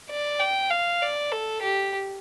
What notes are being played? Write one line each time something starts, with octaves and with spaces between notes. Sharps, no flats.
D5
G5
F5
D5
A4
G4